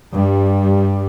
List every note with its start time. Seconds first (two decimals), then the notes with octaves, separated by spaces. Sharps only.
0.12 G2 G3